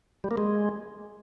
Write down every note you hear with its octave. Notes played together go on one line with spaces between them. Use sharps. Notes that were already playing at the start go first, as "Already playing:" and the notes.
G3
A#3
G#3